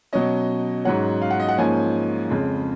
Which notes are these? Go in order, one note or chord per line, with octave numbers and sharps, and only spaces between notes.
B2 F#3 C#4 D#5
G#2 F#3 C#4 F#5
F5
F#5
D#5
F#5
G#2 F3 A#3 C#4 G#5
F2 C#3 G#3